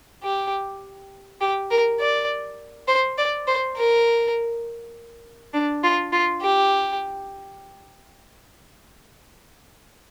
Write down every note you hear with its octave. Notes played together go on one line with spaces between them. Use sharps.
G4
G4
A#4
D5
C5
D5
C5
A#4
D4
F4
F4
G4